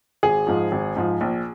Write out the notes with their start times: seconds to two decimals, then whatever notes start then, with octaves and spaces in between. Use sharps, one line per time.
0.23 G#1 G#4
0.47 G#2 F3
0.72 G#1
0.96 G#2 F3
1.21 A#1